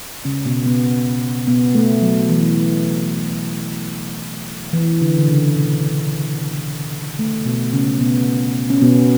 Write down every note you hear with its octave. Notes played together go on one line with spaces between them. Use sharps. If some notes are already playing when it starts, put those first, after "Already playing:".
C#3 C#4
B2 B3
B2 B3
B2 B3
A3
F#3
E3
E3
D3
D3
C#3
B2
A3
B2 B3
C#3 C#4
B2 B3
C#4
B2 B3